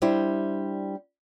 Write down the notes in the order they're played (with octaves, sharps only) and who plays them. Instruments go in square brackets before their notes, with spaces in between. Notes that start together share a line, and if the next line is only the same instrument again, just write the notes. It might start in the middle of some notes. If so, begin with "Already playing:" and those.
[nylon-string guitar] G3 D4 E4 C5